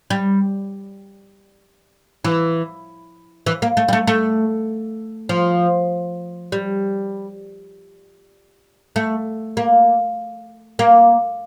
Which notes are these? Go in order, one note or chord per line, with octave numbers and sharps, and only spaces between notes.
G3
E3
E3
A#3
A3
G3
A3
A3
F3
G3
A3
A#3
A#3